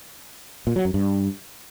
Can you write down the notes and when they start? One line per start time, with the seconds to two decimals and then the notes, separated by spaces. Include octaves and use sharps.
0.67 A#2
0.76 F#3
0.85 F#2
0.94 G2